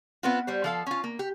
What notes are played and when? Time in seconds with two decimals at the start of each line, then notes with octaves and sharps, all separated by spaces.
0.23 B3 C4 F4
0.47 G3 G4 C5
0.64 F3 A4 F5
0.87 C#4 F4
1.04 A#3
1.19 G4